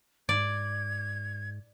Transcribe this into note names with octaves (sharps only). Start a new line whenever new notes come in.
G#2 D5 G#6